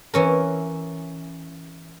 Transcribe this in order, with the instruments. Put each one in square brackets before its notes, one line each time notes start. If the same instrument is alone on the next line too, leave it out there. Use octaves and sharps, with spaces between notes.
[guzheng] E3 C#4 A#4